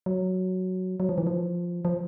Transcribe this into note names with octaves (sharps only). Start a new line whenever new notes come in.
F#3
F#3
F3
E3
F3
F3